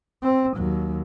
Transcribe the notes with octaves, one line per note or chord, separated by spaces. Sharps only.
C4
D#2 F#3